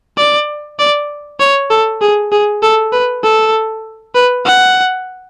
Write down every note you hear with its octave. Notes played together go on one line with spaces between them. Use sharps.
D5
D5
C#5
A4
G#4
G#4
A4
B4
A4
B4
F#5